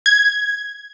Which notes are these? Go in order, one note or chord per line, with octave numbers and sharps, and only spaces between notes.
G#6